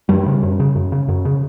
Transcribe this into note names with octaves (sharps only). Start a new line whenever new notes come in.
F#2 G3
C#3
F#2
C#3
F#2
C#3
F#2
C#3